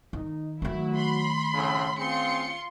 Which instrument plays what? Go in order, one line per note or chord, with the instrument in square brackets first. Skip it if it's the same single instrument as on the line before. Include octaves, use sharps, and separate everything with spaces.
[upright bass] D#3 [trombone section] D#4
[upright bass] D#3 A3 [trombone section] F#3 [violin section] E4
[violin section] B5 C6
[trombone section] F2 A2 C#3
[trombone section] C4 C#4 G#4 [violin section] F4 C6 C#7